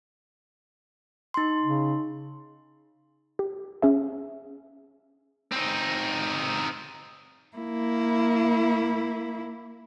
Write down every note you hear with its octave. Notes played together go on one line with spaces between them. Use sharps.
D#4 C6
C#3
G4
C#4 G#4 E5
C4 D#4
A#3 E4